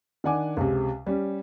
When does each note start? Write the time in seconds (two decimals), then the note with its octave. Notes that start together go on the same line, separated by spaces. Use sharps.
0.24 D#3 D4 F#5 G#5 D6
0.57 C#2 C3
1.07 G3 C#4